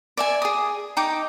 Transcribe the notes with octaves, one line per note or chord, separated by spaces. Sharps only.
D5 E5 G#5
G#4 D#6
D#4 G5 D6